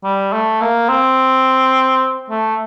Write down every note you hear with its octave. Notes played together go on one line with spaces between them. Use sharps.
G3
A3
A#3
C4
A3